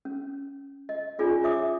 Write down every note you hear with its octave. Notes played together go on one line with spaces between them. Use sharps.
C#4
D#5
C#4 D#4 F4 G#4 D5 G#5
C#5 E5 D6 D#6